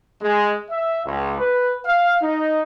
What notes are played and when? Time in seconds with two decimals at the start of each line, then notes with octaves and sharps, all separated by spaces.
0.21 G#3
0.70 E5
1.05 C#2
1.39 B4
1.86 F5
2.22 D#4